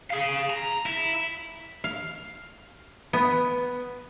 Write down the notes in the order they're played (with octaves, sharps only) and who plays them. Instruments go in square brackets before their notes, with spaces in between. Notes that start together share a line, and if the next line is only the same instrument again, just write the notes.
[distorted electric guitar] G#4 F5
A#5
E4
[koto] F5
B3